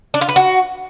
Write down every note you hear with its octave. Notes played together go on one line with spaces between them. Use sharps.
D4
F4
B4
F#4